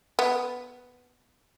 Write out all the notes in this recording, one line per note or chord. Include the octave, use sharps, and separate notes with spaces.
B3